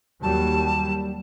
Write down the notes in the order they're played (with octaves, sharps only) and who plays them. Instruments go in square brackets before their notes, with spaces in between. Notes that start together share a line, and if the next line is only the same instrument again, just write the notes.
[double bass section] D#2 F#3 G3 [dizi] A5